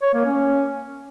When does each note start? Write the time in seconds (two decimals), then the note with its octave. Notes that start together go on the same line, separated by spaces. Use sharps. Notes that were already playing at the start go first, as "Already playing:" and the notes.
0.02 C#5
0.14 A#3
0.25 C#4